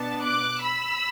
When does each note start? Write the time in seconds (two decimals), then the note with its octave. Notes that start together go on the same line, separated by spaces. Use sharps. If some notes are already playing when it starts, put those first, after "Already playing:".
Already playing: B2 B3 D4 A5
0.23 D6 F#6
0.62 B5 E6